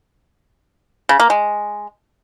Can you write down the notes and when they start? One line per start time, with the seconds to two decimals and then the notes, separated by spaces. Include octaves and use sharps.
1.09 C#3
1.20 A#3
1.30 G#3